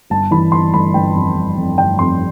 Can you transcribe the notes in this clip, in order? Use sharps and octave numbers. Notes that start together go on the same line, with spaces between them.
G1 A5
E3 B5
G1 C6
G1 B5
G1 G5
F2
G1
F2
G1 G5
F2 C6